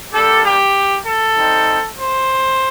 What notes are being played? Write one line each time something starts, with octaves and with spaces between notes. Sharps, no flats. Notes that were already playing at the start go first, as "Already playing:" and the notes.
G3 A#3 D4 G4 A4
G4
A4
G3 C4 D#4
C5